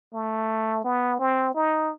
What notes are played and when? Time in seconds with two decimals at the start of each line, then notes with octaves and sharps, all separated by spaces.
0.14 A3
0.84 B3
1.19 C4
1.55 D#4